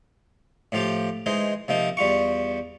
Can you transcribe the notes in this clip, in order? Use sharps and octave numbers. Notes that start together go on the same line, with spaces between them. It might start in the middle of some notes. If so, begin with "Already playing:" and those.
A2 F3 F4 G4
E3 G#3 D#4 C5
C3 F3 A#3 D#4
E2 G3 F4 C#6